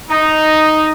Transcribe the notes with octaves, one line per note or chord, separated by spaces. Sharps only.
D#4